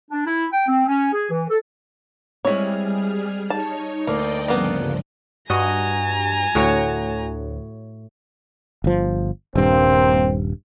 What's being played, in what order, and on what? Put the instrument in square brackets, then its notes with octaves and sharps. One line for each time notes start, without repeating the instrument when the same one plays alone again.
[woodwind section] D4
E4
G5
C4
C#4
G#4
E3
A4
[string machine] G3 G#4 F6 [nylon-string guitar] G#3 C4 [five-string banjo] E4 C#5
[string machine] D#4 C#5 [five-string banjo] A5
[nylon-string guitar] D2 [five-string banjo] A#3 [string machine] D5 D#5 G5
[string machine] G2 C#3 F3 [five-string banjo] A#3 B3
[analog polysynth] G2 [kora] F#4 D#5 [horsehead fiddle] G#5 A#5
[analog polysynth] D2 [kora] A2 F#4 C#5
[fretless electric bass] G1 F3
[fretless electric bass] D#1 G2 [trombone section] A#3 C4